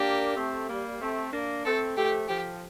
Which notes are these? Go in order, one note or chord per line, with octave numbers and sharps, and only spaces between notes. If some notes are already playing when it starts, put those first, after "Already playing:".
Already playing: A#3 D4 G4
A3 C4
G3 A#3
A3 C4
A#3 D4
A3 C4 A4
F3 A3 G4
F3 G4